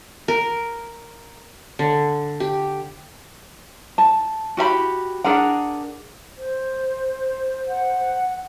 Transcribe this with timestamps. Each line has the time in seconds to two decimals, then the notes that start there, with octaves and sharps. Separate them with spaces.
0.28 A#4
1.79 D3
2.40 G4
3.98 A5
4.57 F#4 G4 E5 B5
5.24 D4 G#4 A#4 F#5
6.38 C5
7.68 F#5